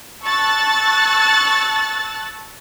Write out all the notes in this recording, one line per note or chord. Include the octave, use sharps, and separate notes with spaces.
A5 C#6 E6 F#6 A6